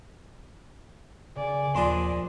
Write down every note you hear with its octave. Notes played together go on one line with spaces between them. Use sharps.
C#3 D5 G#5
A#1 D#2 D4 D#5 C6